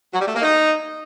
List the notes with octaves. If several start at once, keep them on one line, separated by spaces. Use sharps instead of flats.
F#3
G3
A3
A#3
D#4